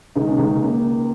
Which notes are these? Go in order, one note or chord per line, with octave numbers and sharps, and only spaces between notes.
C#2 D#4
C#4
C#2 D#4
A#3 C#4